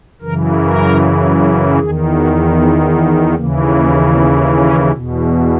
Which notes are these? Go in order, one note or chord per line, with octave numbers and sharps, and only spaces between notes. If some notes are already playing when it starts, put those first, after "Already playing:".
F#2 C#3 E3 A#4
A#4
E2 D#3 G#4
F#4
B3
B3
D#2 C#3 E3 A#3
A#3
B3
C#4
E2 B2